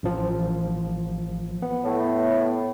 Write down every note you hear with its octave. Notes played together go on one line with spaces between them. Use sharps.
A1 F3
B3
A2